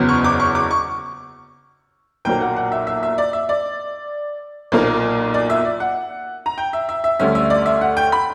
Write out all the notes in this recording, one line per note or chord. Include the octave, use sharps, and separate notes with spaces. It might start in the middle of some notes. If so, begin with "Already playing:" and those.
Already playing: F#1 E2 C#3 F#3 B3
C#6
D6
C#6
D6
C#6
B1 A#2 F#3 A#3 G5
F#5
F#5
E5
E5
E5
D5
E5
D5
B1 A#2 A#3
D5
E5
D5
F#5
A#5
G5
E5
E5
E5
D2 D3 G3 C#4 E5
E5
D5
E5
F#5
G5
B5